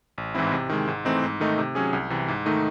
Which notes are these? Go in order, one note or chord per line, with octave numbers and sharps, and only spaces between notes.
A1
G#2 E3 C4 E4
C3
D#3 G#3
G#2
E3 A3 C4 D#4
G#2
D#3 A3 D#4
C3
F#3 C#4 G#4
C2
C3 E3
G#2
D#3 A3 D#4